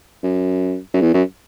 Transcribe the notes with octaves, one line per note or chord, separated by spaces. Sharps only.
F#2
F#2
E2
F#2